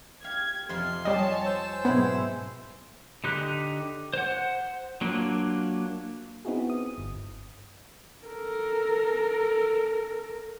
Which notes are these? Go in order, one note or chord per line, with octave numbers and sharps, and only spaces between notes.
G4 F5 G#6
F2 C3 F3 F4 C6
G3 C4 C#5 D#5 G#5 A5
C5 E6
G#2 B2 F#3 B3 C4 E4 G#4
D3 D#4 G4 F#6
C5 F#5
F#3 A#3 D4 F4
B3 C4 D#4 E4 F#4 G#4
D#6
G1
A4 A#4